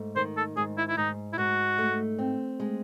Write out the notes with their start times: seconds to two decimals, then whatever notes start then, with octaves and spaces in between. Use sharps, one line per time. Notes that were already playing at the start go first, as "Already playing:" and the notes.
Already playing: G#2 A3
0.16 D#3 C5
0.37 A4
0.57 G#2 G#4
0.78 E4
0.89 E4
0.97 G#2 D#4
1.33 E4
1.38 G#2 F#4
1.78 A3
2.19 C4
2.60 G#3